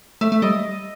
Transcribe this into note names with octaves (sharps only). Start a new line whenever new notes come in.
A3 E5
A3
G3 D#5